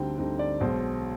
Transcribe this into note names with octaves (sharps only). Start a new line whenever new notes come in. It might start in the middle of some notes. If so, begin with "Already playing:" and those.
Already playing: D2 D3 G3 C4 D#4 G5
D2 D3 G3 C4 D#4
D5
B1 B2 G#3 C5